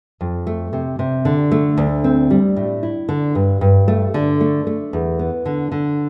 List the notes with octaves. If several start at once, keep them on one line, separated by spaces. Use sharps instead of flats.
F2
A3
C3
C3
D3
A3
D2
C4
G3
A2
E4
D3
G2
G2
A3
D3
A3
A3
E2
B3
D3
D3